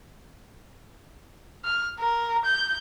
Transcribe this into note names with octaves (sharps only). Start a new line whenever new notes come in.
F6
A#4
G6